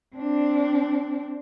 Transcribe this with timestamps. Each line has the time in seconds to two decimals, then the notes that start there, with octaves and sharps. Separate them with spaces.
0.16 C4 D4